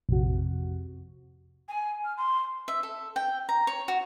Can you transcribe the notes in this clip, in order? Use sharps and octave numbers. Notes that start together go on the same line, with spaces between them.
A#1 F2 C3 F#4
G#5
F6
C6
E5
A4
G5
A#5
C#5
F#4